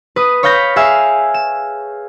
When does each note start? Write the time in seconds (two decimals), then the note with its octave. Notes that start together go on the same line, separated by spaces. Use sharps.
0.16 B4 D#6
0.43 C#5 F5 B5 G6 A#6 B6
0.76 G#4 E5 F5 G#5 E6
1.34 E7